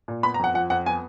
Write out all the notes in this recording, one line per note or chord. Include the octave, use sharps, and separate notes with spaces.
A#2
B3 B5
A#5
F2 F#5
F3 F#5
F2 F#5
B3 G#5